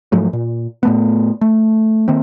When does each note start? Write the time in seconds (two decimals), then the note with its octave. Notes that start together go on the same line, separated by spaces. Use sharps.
0.12 G#2 F3 F#3 A3
0.33 A#2
0.83 A2 A3 B3
1.41 A3
2.08 D#3 A#3 C4